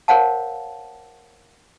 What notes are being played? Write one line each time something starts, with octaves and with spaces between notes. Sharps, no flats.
A#4 C5 C#5 F5 F#5 A5